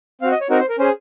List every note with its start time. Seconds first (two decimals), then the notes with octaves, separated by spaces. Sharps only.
0.21 C4 F5
0.25 F#4
0.31 D#5
0.41 C#5
0.50 C4 D#4 F#4 A#4
0.59 C5
0.69 A#4
0.79 C#4 G#4 C5